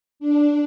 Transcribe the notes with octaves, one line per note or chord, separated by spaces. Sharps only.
D4